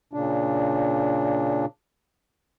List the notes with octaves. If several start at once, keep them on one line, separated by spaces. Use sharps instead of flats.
A#2 C#3 D4